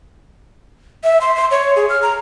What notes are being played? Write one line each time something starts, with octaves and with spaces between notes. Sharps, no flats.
E5
C6
C6
C#5
G#4
F6
A#5